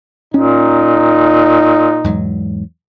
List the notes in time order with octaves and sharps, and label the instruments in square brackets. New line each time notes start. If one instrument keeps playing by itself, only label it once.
[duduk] A#2 [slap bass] C#4 [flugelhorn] D#4
[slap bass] E2 G#2 F#3